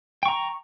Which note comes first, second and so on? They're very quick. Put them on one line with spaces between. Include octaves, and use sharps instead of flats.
G5 C#6 A#5